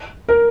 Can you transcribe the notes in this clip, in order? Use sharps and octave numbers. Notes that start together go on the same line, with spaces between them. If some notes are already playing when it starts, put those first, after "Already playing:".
A#4